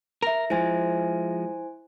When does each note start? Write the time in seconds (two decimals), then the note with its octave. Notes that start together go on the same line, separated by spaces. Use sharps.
0.22 A#4 E5 A#6
0.50 F3 G#3 E4 C5 G#5